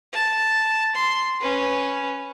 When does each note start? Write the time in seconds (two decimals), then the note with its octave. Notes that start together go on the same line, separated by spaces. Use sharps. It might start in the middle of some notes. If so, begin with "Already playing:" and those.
0.13 A5
0.95 C6
1.40 C#4 B4